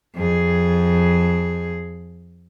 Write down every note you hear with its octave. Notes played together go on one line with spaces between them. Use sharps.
F2 G#4